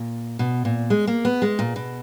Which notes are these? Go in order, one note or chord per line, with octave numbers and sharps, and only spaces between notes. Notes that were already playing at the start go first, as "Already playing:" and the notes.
Already playing: A#2
B2
A#2
G#3
A#3
B3
G#3
A#2
B2